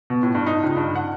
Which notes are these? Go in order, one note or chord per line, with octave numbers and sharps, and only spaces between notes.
B2
A2
G2
D#4
C#2
G2
F#5